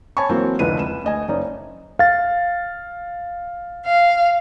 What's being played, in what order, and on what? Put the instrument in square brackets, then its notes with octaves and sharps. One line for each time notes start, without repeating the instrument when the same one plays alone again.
[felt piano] C#5 G#5 A5 B5 C#6
E3 F#3 A#3 C4
F1 C#2 D3 E4 B4 D#7
C#2 E7
D2 D#5 G#5
F#1 C#4 D#4 D5
[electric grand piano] F5 A6
[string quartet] F5